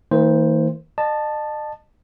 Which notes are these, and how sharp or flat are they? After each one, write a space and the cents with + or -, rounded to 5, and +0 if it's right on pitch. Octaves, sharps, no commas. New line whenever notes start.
D#3 +45 A#3 -45 C5 +0
D#5 -40 A5 +0